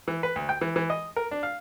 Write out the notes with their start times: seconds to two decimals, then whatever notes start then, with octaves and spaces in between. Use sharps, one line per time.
0.08 E3
0.23 B4
0.36 D2
0.49 G5
0.61 E3
0.76 E3
0.90 D#5
1.16 A#4
1.31 D4
1.43 F5